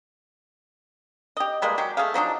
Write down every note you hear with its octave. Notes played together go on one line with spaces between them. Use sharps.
G4 D#5
E3 G3 G#3 A#3
F#3 G4
A3 G#4 F5
F3 F#3 D4 D#4